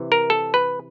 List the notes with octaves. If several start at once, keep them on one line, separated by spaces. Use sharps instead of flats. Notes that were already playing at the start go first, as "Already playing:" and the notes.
Already playing: C3 E3
A#4
A4
B4